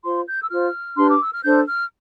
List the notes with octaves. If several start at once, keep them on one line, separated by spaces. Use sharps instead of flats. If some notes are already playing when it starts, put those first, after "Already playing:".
F4 C5 C6
G6
E6
F4 C5 F6
D4 G4 B4 C6
D6
E6
F6
D4 A4 C5 G6
F6